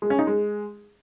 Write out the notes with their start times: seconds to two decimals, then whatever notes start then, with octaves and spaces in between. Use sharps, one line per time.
0.02 G#3
0.10 C#4
0.19 D#4
0.27 G#3